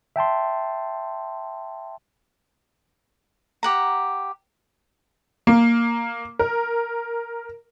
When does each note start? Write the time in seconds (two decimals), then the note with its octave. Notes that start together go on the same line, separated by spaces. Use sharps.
0.16 E5 G5 A5 C6
3.63 G4 F#5 A#5
5.47 A#3
6.39 A#4